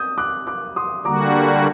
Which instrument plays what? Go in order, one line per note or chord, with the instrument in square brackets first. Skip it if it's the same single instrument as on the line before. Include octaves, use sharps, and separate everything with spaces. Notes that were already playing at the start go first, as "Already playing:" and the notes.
Already playing: [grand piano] D#6 G6
D6 F#6
D6 F#6
C6 D#6
[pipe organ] D3 G3 A#3 F#4 [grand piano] A#5 D6